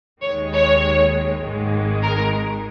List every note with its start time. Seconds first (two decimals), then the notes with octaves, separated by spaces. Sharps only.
0.22 D#2 D#3 G#3 C#5
0.53 C#5
1.42 G#1 G#2 D#3 G#3
2.02 A#4